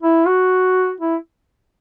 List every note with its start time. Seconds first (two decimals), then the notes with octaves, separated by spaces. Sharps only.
0.02 E4
0.27 F#4
1.00 E4